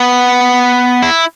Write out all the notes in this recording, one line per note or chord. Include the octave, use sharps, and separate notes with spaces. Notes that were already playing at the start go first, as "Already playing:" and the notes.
Already playing: B3
E4